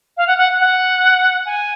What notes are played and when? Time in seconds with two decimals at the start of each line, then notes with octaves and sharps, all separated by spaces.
0.17 F5
0.27 F#5
0.38 F#5
0.60 F#5
1.46 G#5